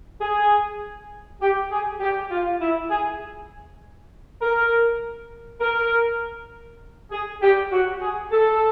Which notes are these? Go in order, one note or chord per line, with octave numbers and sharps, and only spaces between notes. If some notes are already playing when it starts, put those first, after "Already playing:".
G#4
G4
G#4
G4
F4
E4
G#4
A#4
A#4
G#4
G4
F#4
G#4
A4